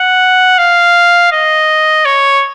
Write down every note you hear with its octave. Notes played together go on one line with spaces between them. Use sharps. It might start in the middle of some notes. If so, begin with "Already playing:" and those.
Already playing: F#5
F5
D#5
C#5